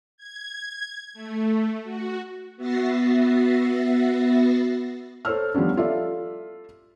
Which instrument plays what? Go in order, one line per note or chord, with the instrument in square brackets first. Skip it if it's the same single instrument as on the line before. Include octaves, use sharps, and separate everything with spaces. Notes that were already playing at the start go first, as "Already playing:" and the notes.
[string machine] G#6
A3
F#4
B3 F#4 E5 A6 A#6 C7
[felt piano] A4 C5 C#5 E6 F6
F3 G3 B3 C#4 D4
F4 A4 D5 E5 F5